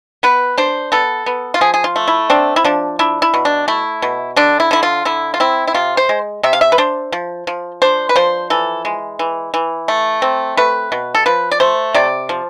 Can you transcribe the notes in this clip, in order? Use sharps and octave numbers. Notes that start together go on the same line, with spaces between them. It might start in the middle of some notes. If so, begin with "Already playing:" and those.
B3 B4
D4 C5
B3 A4
B3
F4
F3 G#4
G#4
F4
A3
E4
C4 D4
E4
F3 D4
D4 E4
E4
B2
D4
A3 E4
B2
D3 D4
E4
D3 E4
F4
D3 E4
F4
C4 E4
E4
C3 F4
C5
G#3
C3 E5
F5
E5
B4
D4 C5
F3
F3
D4 C5
B4
F3 C5
E3 A4
G#3
E3
E3
A3
C4
A3 B4
B2
A4
F3 B4
D5
A3 C5
C3 D5
F3